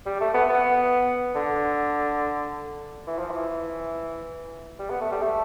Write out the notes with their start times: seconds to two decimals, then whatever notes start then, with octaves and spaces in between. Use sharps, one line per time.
0.06 G3
0.20 A3
0.34 B3
0.49 B3
1.35 D3
3.07 E3
3.18 F3
3.30 E3
4.79 G3
4.90 B3
5.01 A3
5.12 G3
5.22 A3